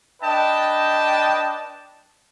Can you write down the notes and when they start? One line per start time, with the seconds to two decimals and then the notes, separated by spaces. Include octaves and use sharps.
0.22 D4 B4 D#5 G5 A5